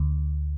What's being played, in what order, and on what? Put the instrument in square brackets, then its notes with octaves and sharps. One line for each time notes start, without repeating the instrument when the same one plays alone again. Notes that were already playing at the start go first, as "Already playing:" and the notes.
Already playing: [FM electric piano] D2